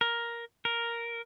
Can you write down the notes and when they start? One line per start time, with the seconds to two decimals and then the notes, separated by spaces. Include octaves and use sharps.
0.01 A#4
0.65 A#4